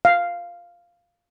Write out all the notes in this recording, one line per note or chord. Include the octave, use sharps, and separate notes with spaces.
F5